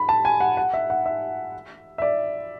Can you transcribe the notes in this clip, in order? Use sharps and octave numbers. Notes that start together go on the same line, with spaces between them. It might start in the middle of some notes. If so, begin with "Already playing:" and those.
Already playing: B5
A5
G#5
F#5
F#5
E5
F#5
E5
E5
D5